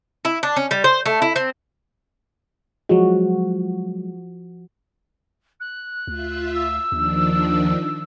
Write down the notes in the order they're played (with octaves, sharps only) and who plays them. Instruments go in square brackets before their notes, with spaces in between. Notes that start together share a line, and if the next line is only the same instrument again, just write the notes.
[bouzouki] E4
D4
C#4
G3
C5
A3
E4
C4
[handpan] F3 F#4 [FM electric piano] F#3 G#3
[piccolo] F#6
[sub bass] D2 [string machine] F4 E5
[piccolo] E6
[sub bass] D#2 [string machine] D#3 F3 D4